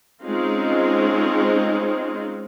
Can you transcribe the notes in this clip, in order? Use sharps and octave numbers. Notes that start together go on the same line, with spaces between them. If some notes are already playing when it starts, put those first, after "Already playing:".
G#3 C4 C#4 D#4 F4